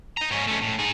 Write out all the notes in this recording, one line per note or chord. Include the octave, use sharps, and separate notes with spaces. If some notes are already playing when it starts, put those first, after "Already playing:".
D#5 A#5
G#2 C#4
A3 C#4
A2
D#4 G#4